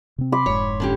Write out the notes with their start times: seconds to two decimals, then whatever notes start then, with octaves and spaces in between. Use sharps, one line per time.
0.18 C3 C4
0.32 B5 C6 D6
0.46 F1 G#2 C#5
0.80 D3 C#4 G4